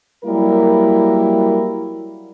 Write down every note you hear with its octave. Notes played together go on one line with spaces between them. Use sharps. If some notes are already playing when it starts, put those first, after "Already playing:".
F#3 G3 A#3 E4 A#4